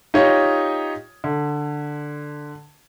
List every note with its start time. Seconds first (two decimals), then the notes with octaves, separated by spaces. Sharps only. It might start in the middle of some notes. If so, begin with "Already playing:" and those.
0.14 D#4 F4 G4 C#5 D#5
1.24 D3